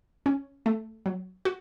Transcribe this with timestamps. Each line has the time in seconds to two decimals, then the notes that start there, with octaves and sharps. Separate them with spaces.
0.26 C#4
0.66 A3
1.06 F#3
1.45 F#4